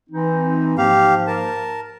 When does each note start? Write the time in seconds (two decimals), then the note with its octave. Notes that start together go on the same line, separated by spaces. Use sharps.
0.10 E3 C4 D#4
0.78 G#2 F3 A#3 G4 F5
1.27 A#4 A5